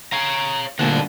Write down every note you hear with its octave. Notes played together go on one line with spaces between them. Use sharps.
C#5 F5 A#5
D2 G2 A#2 D#3 F#5 A5